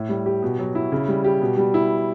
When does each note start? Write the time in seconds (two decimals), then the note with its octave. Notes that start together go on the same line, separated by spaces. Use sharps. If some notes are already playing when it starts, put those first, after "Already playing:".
Already playing: A2
0.09 G3
0.26 G4
0.42 B2
0.59 F#3
0.75 E4
0.92 C#3
1.08 G3
1.24 G4
1.41 B2
1.58 G3
1.74 E4